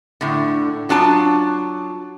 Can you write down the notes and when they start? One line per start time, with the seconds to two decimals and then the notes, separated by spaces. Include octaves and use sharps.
0.21 A2 D3
0.89 F#3 D4 F4 A5